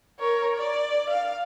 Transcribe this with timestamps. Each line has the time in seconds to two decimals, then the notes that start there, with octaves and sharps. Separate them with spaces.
0.19 A#4 C#5
0.56 D5
1.09 F5